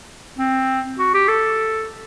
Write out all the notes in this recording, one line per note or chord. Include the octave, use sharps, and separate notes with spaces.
C4
F#4
G4
A4